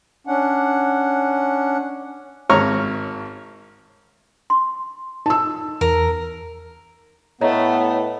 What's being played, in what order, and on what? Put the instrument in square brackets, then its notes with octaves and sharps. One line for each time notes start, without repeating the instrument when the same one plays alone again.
[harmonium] C#4 D4 F#5
[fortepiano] G#1 C#5 A#5 C#6 F6
[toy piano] C6
[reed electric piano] D#4 [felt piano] A5 E6
[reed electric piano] E2 [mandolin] A#4
[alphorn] A2 [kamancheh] A3 [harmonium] B3 [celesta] C#5 D#5 A#5